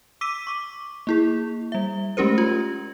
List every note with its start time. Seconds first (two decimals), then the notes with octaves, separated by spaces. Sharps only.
0.21 D6 E6 B6 D#7
0.47 C#6 D6
1.07 A#3 E4 G#4
1.72 G3 E5
2.17 G#3 A3 C#4 G4 A#4 C5
2.38 F4